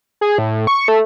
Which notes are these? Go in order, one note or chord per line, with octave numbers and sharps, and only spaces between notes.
G#4
A2
C#6
A3